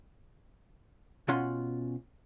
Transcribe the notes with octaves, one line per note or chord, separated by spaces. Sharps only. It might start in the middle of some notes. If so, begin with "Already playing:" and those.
B2 C#4 F4 F#5 C6